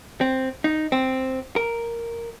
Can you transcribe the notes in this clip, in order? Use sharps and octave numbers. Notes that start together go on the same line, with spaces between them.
C4
D#4
C4
A#4